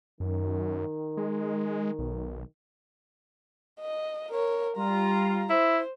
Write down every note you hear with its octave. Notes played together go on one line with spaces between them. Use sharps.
F#2 D#3
G#3
B1
D#5
A#4 C#5
G3 F4 A#5
E4 C5